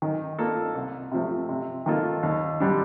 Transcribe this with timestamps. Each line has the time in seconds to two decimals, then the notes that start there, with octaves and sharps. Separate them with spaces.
0.02 D#3
0.39 A#3 F4 A4
0.75 C2
1.12 C3 F3 A3
1.49 C3
1.86 D#3 A#3 F4 A4
2.23 D#2
2.60 D3 G3 D4